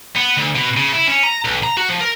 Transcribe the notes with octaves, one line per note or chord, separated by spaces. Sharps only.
B3
D2
B2
C#3
E4
C#4
A#5
B1
A#5
F#4
F3
A#4